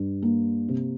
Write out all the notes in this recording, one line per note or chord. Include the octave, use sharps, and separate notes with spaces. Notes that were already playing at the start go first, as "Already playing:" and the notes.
Already playing: G2
A#3
C3